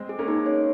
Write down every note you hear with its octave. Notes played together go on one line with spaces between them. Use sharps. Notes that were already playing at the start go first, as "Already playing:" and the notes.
Already playing: G#3 C4
G#4
A#3 C#4
D#4
C#5